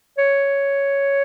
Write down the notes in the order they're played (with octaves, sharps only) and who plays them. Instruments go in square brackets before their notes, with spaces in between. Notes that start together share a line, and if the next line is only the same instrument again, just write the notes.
[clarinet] C#5